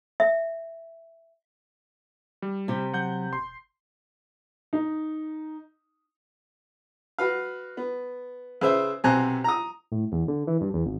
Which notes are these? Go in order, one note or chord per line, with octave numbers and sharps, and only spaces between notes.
E5
G3
C3 G4
F#3 F#5 G6
E1 C6
D#4
F#4 B4 F5
B3
C#3 B4 C5 E5
B1 C3 C5 G#5 A#5 F#6
A#5 D#6
A2
E2
D3
E3
G2
E2
G#1